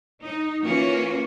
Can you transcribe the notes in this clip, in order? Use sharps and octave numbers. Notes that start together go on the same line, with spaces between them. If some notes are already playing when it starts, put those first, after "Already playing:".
D#4
E3 A#3 C#4 F4 F#4